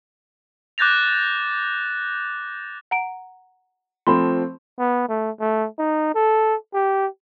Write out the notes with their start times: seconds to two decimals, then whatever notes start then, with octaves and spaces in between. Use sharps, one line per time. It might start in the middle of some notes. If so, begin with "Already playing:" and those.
0.78 D6 F#6 G6 A6 A#6 F7
2.91 F#5 A#5 D7
4.07 F3 A3 C4 B5 C6
4.79 B3
5.09 A3
5.40 A3
5.79 D#4
6.15 A4
6.74 G4